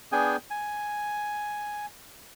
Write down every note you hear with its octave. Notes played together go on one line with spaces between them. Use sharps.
B3 D4 G#4 G5 G#5
G#5